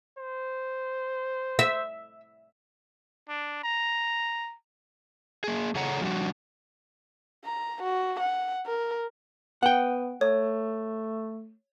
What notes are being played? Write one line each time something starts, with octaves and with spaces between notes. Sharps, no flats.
C5
E5
D4
A#5
A#3 G#4
C#3 G#4 A4 C#5 F#5 A#5
F3 G3 D4 F#4
A#5
F#4
F#5
A#4
B3 F#5 G5
A3 C#5